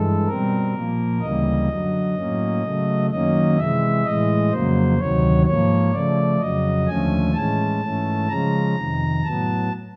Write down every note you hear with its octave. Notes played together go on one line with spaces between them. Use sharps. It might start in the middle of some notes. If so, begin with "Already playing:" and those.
Already playing: G2 E3 G#3 A4
B2 G3 C4 A#4
A#2 F3 A#3
D2 C#3 E3 G3 A#3 D#5
F#2 D3 F#3
A2 F#3 A#3 C#4
C#3 F#3 A3
F#2 D#3 F#3 A#3 C#4 D#5
C3 E3 G#3 E5
A2 E3 G#3 D#5
F2 C#3 F#3 A#3 C5
D2 C3 D#3 F#3 C#5
G#2 F3 A#3 C#5
C#3 F3 A3 D5
F2 C#3 F#3 D#5
D#2 D3 F3 A3 C#4 G#5
A2 E3 G#3 C#4 A5
G#2 E3 A3 C#4
C#3 F3 G#3 C#4 A#5
F2 C3 D#3
A2 F#3 B3 A5